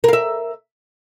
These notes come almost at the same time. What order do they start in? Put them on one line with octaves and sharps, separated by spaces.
A#4 F5 E5